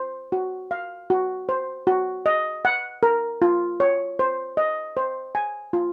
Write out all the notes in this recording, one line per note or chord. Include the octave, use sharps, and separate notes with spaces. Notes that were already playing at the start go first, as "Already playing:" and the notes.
Already playing: C5
F#4
F5
F#4
C5
F#4
D#5
F#5
A#4
F4
C#5
C5
D#5
C5
G#5
F4